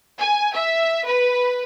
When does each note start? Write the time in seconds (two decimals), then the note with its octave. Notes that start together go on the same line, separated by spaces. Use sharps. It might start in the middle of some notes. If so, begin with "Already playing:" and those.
0.19 G#5
0.54 E5
1.05 B4